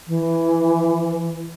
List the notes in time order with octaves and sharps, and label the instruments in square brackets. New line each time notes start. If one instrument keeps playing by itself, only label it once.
[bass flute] E3